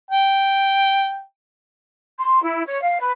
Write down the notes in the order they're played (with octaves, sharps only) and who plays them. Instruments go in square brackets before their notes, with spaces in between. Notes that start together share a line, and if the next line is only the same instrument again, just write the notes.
[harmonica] G5
[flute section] C6
E4
C#5
F5
B4